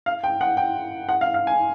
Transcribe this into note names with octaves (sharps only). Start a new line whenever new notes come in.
F5
G5
F#5
G5
F#5
F5
F5
G#5